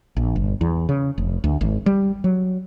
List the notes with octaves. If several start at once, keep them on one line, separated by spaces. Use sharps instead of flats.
A#1
G1
E2
C#3
F1
D2
G#1
G3
F#3